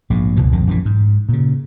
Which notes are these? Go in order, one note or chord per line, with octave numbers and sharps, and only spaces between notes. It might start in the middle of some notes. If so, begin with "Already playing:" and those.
A#1 G#2
F1 C#2 B2 E3
A#1 F2 D#3
A#1 F#2 C#3 E3
G#2
A#2 C#3